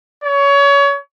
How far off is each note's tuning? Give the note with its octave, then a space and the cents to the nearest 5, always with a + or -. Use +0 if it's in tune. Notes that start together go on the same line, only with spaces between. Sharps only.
C#5 +25